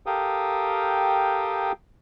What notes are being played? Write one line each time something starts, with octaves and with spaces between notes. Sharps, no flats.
G4 A4 A#4 F5 G5 D#6